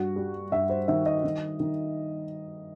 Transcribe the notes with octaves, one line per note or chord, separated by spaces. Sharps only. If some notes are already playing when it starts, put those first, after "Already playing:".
Already playing: G2 F#4
G3
G2 E5
C5
D#3 E5
D#5
D#3
D#3